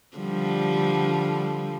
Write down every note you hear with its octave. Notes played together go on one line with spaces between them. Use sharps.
D3 F3 G3